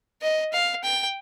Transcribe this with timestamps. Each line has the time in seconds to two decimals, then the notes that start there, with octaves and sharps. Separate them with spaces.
0.22 D#5
0.53 F5
0.83 G5